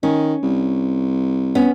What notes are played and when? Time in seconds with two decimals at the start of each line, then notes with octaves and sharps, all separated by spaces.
0.03 D#3 C#4
0.43 C2
1.55 B3 C#4